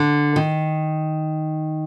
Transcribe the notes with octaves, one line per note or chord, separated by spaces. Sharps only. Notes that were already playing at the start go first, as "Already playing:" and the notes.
Already playing: D3
D#3